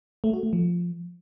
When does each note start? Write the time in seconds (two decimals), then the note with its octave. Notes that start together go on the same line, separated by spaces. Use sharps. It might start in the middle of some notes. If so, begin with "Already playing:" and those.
0.24 A3
0.33 F#4
0.43 A3
0.53 F3